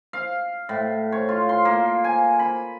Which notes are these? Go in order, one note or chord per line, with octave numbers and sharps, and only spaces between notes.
F5
A2
C#5
F4
C6
A#3
G#5
B5